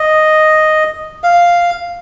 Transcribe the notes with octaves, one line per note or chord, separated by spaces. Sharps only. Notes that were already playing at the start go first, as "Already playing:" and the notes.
Already playing: D#5
F5